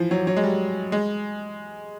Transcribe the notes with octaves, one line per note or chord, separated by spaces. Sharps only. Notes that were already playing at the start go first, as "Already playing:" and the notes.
Already playing: E3 F3
F#3
F#3
G#3
G3
G#3